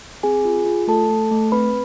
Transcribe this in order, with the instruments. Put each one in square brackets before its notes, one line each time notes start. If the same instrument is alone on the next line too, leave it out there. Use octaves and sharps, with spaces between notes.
[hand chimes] C4 G#4 G#5
F4
F4
A3 A4 A5
A3
A3
C4 B4 B5